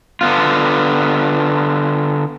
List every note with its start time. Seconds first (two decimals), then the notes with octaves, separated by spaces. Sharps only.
0.21 D3 B3 F4